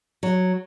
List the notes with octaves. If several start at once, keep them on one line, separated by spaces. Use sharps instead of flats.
F#3